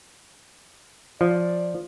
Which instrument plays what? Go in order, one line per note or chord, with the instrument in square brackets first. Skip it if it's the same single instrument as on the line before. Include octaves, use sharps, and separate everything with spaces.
[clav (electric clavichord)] F3 [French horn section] D5